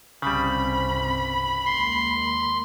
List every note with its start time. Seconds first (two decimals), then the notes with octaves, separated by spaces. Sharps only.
0.22 G1 C2 C#3 G3 C4 B5
1.66 D#2 G#3 A#3 C6